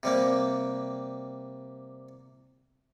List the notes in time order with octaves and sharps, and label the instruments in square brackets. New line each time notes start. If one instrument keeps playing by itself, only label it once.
[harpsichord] C3 G3 A#3